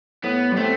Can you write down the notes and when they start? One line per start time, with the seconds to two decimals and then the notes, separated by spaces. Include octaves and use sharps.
0.23 A2 B3
0.52 G3
0.57 A3 C4